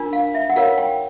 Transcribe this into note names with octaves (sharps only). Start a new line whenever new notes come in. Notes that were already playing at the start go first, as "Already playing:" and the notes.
Already playing: D4 F4 A#4
F5
E5
F#5
F4 A#4 C#5 F5
G5